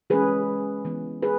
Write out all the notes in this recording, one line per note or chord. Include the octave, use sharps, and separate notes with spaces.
E3 G#3 C#4 G#4 B4
E3 B3
G#4 B4